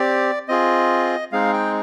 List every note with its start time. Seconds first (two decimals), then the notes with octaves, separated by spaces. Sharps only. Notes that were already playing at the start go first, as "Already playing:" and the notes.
Already playing: C4 G4 D5
0.48 C4 F4 G#4 D#5
1.32 G#3 C4 D#4 G#4 F5
1.53 G5